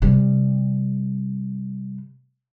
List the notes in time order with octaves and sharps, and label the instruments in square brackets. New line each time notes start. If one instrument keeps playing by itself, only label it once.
[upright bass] C3 G3